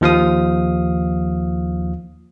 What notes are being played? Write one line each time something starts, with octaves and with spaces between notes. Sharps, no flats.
D#2 F3 F5 D#6